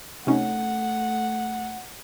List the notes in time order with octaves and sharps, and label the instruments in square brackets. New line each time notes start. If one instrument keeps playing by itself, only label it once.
[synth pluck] C3 C#4 D#4 [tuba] A3 [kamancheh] F#5